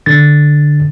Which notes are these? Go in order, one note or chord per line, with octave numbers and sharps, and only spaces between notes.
D3 A6